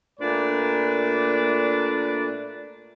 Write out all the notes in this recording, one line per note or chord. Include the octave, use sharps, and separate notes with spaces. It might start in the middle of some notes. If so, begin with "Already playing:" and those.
A#2 A3 A#3 D4 B4 D5